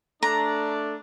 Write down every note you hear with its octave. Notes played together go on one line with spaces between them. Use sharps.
A3 D4 A#5